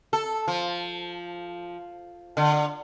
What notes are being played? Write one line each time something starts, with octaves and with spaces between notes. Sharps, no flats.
A4
F3
D3